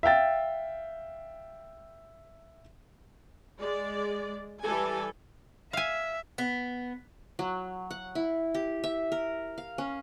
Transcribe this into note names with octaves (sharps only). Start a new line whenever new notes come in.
E5 F5 G5 A6
G#3 D5
E3 G3 A4 G#5
E5 F5 G#5
B3
F#3
F#5
E4
G4
E5
A#4
F5
C#4